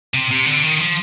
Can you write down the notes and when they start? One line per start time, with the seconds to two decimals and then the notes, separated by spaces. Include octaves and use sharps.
0.14 C3
0.31 C3
0.46 D3
0.63 D#3
0.78 F3